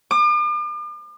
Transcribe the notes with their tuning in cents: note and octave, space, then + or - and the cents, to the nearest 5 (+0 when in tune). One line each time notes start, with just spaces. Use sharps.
D6 +45